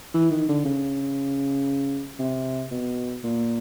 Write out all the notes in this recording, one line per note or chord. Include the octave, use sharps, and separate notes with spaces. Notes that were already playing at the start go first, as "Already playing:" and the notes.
E3
D#3
D3
C#3
C3
B2
A#2